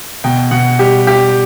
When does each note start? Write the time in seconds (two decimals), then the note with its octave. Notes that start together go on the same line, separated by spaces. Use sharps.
0.24 B2 G5
0.51 B2 F#5
0.79 G3 G4
1.07 G3 G4